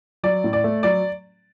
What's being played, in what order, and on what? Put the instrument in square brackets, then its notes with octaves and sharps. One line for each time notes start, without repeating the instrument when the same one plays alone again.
[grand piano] F#3 D5
A2
D5
A3
F#3 D5